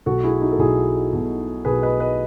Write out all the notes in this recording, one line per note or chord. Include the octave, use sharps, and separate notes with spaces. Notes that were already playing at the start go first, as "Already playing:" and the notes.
B1 B2 F#4 A4
E4 G#4
D#4 F#4
A4
B1 B2 E4 G#4
B1 B2
B1 B2 G#4 B4
B4 D#5
B4 D#5